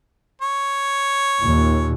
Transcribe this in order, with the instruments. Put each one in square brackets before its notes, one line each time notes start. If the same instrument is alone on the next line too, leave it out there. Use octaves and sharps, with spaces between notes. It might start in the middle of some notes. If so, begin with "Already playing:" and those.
[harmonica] C#5
[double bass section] D#2 A#2